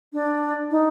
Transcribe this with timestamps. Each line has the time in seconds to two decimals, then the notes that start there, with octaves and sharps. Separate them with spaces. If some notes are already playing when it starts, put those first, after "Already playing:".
0.13 D4
0.71 D#4